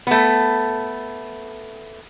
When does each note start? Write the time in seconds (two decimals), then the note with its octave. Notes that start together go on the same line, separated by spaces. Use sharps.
0.07 A3 B3